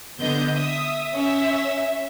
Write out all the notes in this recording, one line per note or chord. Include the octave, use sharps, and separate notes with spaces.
D3 B3 D#5 G6
E5 D#6
C#4 E5